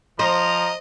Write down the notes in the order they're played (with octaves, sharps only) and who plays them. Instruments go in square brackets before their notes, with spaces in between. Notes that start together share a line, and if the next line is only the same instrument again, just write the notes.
[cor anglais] F3 [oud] C5 [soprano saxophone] D#5 [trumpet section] A#5